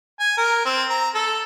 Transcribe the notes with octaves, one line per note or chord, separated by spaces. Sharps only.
G#5
A#4
C4
A#5
A4